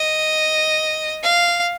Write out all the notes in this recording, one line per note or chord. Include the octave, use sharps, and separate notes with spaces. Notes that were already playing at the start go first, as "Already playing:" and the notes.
Already playing: D#5
F5